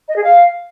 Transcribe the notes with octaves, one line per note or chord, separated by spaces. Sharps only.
D#5
G#4
F5